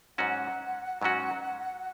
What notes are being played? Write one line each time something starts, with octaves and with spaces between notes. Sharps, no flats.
G#2 F#3 C#4 F#4 F#5
G#2 F#3 C#4 F#4